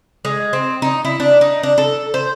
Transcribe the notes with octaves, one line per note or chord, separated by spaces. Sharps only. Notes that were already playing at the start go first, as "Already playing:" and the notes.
G#3
C4
D#4
E4
D4
D#4
D4
A4
C5